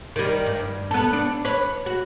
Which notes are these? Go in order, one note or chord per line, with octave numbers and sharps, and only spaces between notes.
D#3 G3
G2
B3 A4
D4
B4 C#5
F#4